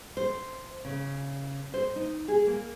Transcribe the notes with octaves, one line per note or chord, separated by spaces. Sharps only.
C5
C#3
C5
D#4
G#4
A#3